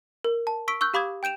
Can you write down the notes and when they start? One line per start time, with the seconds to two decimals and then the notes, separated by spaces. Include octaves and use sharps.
0.24 A#4
0.47 A5
0.68 C#6 E6 B6 D7
0.81 C#6 E6 F#6 G6
0.94 G4 F5 B5 D6 D#6 G#6
1.23 G5 G6 D7 E7 F7